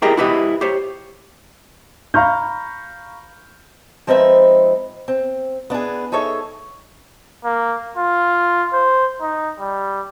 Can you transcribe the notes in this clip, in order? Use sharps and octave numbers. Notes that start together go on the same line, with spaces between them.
E4 G4 G#4 A#4 D#5 G5
E4 F#4 G4 B4 D#5
G4 C5 C#5
F5 A#5 B5 C#6 F6 G6
F3 G#3 C4 D#4 B4 E5
C4
B3 D4 E4 G#4
D#4 G#4 A4 C#5 E5
A#3
F4
C5
D#4
G3